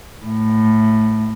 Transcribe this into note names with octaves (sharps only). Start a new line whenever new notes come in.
A2